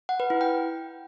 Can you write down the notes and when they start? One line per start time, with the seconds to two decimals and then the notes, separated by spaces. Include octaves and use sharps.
0.09 F#5
0.20 B4
0.30 E4
0.41 G5